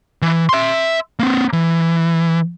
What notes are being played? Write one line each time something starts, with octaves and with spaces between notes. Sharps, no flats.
E3
E5 C6
A#3 C4
E3